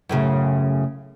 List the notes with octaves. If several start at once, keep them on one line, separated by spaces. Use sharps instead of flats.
F#2 A2 C#3